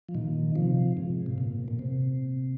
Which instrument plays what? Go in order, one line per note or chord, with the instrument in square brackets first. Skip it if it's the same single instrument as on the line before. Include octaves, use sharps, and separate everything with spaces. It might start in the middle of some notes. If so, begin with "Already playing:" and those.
[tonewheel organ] F3
A#2 D#3
C3 F3
G#2
C3
A#2
A#2
C3